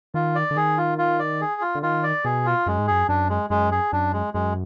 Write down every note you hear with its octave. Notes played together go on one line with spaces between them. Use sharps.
D#3 F4
D5
D3
D#3 G#4
F4
F4
D5
G#4
F4
D3
D#3 F4
D5
B2 G#4
F4
F#2 G#3
G#2
F#2 G#4
F#2 D4
G#3
F#2 G#3
G#4
F#2 D4
G#3
F#2 G#3